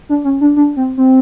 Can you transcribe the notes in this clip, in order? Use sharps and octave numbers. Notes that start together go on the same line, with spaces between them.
D4
C#4
D4
D4
C4
C4